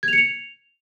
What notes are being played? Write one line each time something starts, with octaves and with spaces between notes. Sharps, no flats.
G#6
F7
C#7
F7